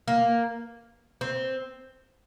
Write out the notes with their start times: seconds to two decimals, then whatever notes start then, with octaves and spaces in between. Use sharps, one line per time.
0.08 A#3
1.21 C4